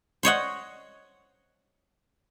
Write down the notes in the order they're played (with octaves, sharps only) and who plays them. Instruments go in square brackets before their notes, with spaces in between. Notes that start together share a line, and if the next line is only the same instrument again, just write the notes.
[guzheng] C5 C#5 D#5 F#5